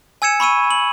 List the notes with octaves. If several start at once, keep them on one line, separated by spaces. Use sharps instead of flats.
G#5 E6 G#6 C#7 E7
B5 C#6 E6 D#7
F#7